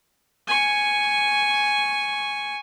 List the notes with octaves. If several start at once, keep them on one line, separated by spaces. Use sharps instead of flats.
G#5 C#6